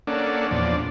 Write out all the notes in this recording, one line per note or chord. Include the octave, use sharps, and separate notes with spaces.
A#3 C#4 D4 A4 D5 F#5
E2 A#2 F3 D4 D5